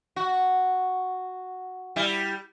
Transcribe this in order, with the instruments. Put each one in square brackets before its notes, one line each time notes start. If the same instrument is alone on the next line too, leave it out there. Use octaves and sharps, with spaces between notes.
[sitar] F#4
G3 E4